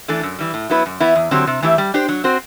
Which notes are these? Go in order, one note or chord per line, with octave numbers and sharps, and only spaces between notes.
E3 A3 D4 A4
F#2
E3 G3
A2
F#3 B3 E4 B4
F#2
E3 B3 E4
E2
D3 F#3 C4 G4
C3
E3 A3 E4 G4
G3
D4 G4 C5
F#3
C4 F#4 C5